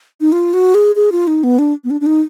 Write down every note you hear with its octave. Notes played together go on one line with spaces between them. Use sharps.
D#4
F4
F#4
G#4
G#4
F4
D#4
B3
D4
B3
D4
D4
D#4